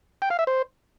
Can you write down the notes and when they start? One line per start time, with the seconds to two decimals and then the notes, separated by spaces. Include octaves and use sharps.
0.22 G5
0.30 F5
0.39 E5
0.47 C5